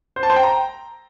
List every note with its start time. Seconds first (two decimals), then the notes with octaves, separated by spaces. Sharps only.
0.16 C5
0.23 A5
0.30 C5
0.36 G5
0.43 A#5